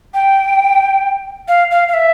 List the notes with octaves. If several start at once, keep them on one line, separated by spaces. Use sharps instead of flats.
G5
F5
F5
F5
E5